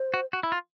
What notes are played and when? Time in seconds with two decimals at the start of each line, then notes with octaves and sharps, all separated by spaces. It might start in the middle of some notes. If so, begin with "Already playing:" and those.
Already playing: C5
0.14 F#4
0.33 F#4
0.43 E4
0.52 F4